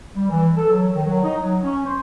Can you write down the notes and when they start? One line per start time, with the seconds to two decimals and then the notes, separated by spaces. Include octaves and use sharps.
0.15 G3
0.30 E3
0.57 A4
0.70 F#3
0.94 D#3
1.06 F#3
1.23 D#4
1.41 F#3
1.63 C#4
1.86 C5